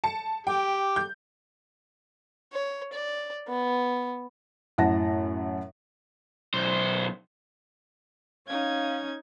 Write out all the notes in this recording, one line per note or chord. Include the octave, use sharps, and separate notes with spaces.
A5 C#7
G4 G5
G6
C#5
D5
B3
F#2 A2 F#5 A5 A#6
B1 C5
C#4 D#4 F5 G#6